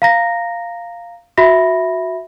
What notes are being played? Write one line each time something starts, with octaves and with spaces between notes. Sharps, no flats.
F5 A#5 A#6
F#4 E5 B5 A#6